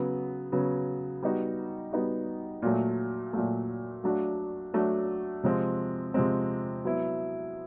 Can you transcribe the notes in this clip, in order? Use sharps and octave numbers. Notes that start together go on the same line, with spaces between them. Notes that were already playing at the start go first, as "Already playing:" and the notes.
Already playing: C#3 F#3 B3
C#3 F#3 B3
G3 B3 D#4 F#4
G3 B3 D#4 F#4
A#2 F#3 A3
A#2 F#3 A3
F#3 A3 D4 F#4
F#3 A3 D4 F#4
C3 F3 G#3 C4
C3 F3 G#3 C4
F#3 B3 E4